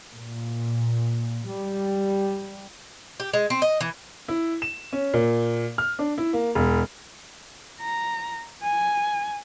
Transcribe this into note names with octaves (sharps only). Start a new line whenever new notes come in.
A#2
G3
G4
G#3
C4
D#5
E3
E4
E7
C#4
A#2
F6
D4
E4
A#3
E1
A#5
G#5